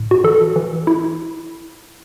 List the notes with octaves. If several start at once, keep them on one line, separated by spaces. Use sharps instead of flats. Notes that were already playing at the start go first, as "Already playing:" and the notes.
Already playing: A2
F#4
E3 A4
E3
E4